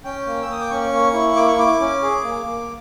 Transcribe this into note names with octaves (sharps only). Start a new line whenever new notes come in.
C#4 G5
A#3
E6
A#3 D#6
D6
C#4 C#6
A#3
E4
A#3 D6
C#6
E4 D6
C#4
G#4
A#3
A#3